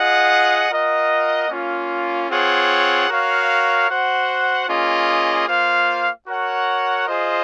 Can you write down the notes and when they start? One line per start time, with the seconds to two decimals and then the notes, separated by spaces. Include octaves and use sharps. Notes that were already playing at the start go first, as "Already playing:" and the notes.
Already playing: F4 G#4 D#5 F#5
0.70 F4 A#4 D#5 F#5
1.49 A#3 C#4 F4
2.30 C4 F4 G#4 C#5 F#5
3.09 F#4 A#4 C#5 F5
3.89 F#4 C5 F#5
4.68 A#3 C#4 F4 G#4 D#5
5.47 A#3 F4 C5 F5
6.27 F#4 A#4 C#5 F#5
7.07 F4 G#4 C5 D#5